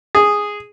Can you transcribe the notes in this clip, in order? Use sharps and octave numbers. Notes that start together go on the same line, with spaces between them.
G#4